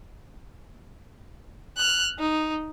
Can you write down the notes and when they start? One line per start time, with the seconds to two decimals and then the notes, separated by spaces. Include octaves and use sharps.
1.77 F6 F#6
2.19 D#4